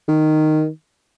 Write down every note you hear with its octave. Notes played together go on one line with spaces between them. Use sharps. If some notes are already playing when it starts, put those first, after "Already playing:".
D#3